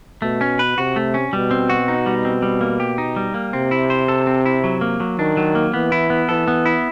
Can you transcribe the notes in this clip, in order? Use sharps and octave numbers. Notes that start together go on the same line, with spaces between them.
B2 A3
C#4
B4
C3 F#4
A3
C#4
B2 G3
C4
F#4
D#4
G3
C4
G3
A#3
G4
D#4
G3
A#3
C3 C4
E4
C5
A4
C4
E4
F#3
A#3
F#3
D#3 D4
F#3
A#3
E3 B3
E4
B3
E3 A4
B3
E4